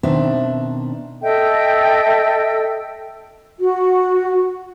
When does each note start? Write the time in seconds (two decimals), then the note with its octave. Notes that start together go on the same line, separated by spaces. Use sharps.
0.03 B2 D#3 C4 D4 E5
1.22 A4 D#5 E5 G5
3.59 F#4